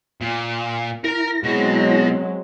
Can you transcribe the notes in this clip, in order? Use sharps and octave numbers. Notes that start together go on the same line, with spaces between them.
A#2
E4 A#4 A#5 A#6
B2 F#3 G#3 C4